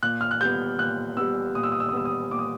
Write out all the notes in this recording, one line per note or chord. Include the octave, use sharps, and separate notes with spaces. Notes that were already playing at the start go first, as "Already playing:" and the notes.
A#2 F#6
F6
F#6
G3 B3 G6
A#2 F#6
G3 B3 E6
A#2 D#6
E6
D#6
E6
D#6
G3 B3 E6
D#6
A#2 D6
D#6